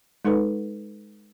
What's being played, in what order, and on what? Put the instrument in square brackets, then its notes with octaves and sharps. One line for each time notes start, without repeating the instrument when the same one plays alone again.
[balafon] G#3 D#4 A4 B4